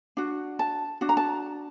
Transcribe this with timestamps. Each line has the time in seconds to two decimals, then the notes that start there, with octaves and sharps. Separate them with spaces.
0.17 D4 F#4
0.59 A5
1.01 D4 F#4
1.09 A#5
1.17 A5